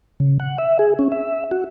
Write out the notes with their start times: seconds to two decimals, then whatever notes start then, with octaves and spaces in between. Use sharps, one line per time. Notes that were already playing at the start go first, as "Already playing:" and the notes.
0.20 C#3
0.40 F#5
0.58 E5
0.79 G#4
0.99 C#4
1.12 E5
1.51 F#4